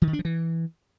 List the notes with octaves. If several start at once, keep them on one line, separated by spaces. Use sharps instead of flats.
E3
D#3
D4
F3
E3